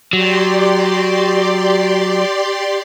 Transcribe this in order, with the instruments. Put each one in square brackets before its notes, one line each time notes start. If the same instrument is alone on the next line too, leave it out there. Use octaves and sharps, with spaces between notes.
[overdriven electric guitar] F#3 [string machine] G4 D5 C6